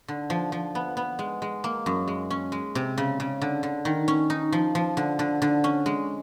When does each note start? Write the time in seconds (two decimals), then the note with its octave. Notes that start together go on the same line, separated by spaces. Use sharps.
0.08 D3
0.30 F3
0.52 F3
0.75 B3
0.97 B3
1.19 G#3
1.42 G#3
1.64 A#3
1.86 F#2
2.08 G#3
2.31 C#4
2.52 G#3
2.75 C3
2.98 C#3
3.20 C#3
3.42 D3
3.63 D3
3.85 D#3
4.08 C#4
4.30 D#4
4.52 F3
4.75 F3
4.97 D3
5.19 D3
5.42 D3
5.64 C#4
5.86 G#3